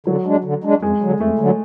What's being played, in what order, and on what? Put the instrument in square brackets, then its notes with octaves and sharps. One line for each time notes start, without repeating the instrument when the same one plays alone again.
[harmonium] D3 [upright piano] F#3
[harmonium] G#3 D4
D3
G#3 D4
[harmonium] F2 [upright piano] G#3
[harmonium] D3 F#3
[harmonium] F2 [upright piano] A3
[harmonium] D3 F#3